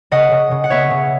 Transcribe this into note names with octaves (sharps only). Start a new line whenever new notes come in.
C#3 D#5 F#5
C#3
C#3
F#5
B3 C#5 E5
C#3